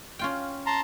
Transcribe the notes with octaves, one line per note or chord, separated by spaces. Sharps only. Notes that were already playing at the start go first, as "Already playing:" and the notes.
C#4 F4 G5
A5 A#5 C6